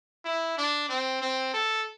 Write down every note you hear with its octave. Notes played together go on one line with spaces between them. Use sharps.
E4
D4
C4
C4
A4